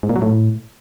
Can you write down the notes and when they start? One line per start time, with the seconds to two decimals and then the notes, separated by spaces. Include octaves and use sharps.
0.03 G#2
0.09 A#2
0.16 F#3
0.22 A2